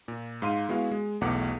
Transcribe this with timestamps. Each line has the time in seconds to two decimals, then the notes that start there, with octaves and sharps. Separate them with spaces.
0.08 A#2
0.42 G#2 F5 C6 D#7
0.69 G#3 B3 E4 F#4 F5
0.92 G#3
1.21 B1 E2 B2 A3 F#5 D6